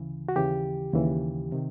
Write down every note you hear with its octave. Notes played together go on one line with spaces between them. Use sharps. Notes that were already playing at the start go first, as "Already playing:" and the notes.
Already playing: D2 C#3 E3
F#4
D#2 C#3 E3 G4
D#2 C#3 E3
C3 D#3